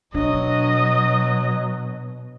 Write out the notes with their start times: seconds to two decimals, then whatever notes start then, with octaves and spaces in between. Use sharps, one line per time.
0.14 B2 F#3 D4 D#5